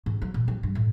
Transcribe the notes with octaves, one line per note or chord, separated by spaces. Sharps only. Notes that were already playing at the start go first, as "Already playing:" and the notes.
G#2
F#3
A#2
F#3
G2
A2